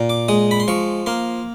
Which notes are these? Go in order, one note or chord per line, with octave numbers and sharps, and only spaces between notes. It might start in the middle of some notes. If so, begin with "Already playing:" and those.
Already playing: A#2
D6
G#3 D#6
B5
C6
F3 C#6
A#3 C6